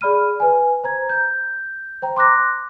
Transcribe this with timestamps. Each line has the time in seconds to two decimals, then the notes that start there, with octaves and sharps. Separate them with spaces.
0.01 G#4 D5 B5 F6 D#7
0.40 B4 G#5
0.84 C5 A#5 G#6
1.09 G6
2.02 C5 G5 A#5
2.16 C6 D6 F#6 A#6